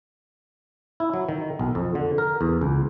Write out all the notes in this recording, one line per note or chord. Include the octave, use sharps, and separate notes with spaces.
E4
F#3
D#3
B1
F2
D3
A#4
E2
C#2